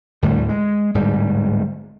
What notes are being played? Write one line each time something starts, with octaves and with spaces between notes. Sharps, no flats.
D2 A2 D3 G3
G#3
D1 G#2 G3